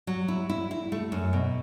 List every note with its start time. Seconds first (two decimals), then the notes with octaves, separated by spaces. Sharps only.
0.07 F#3
0.28 E4
0.50 E4
0.71 E4
0.92 A3
1.12 F#2
1.33 B2